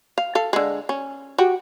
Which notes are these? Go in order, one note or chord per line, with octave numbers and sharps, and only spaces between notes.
F5
A4 F5
D3 G#3
C#4
F#4 G4